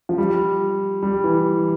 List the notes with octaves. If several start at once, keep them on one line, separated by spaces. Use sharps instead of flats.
F3
G3
G3
E3